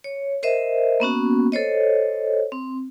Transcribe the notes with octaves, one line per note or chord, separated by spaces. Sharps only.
C#5
A#4 C5 D#5 E5
A#3 B3 C#4 F#4
A4 C5 C#5 D#5
C4